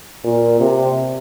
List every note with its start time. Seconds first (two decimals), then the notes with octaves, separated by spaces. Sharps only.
0.24 A#2
0.60 C3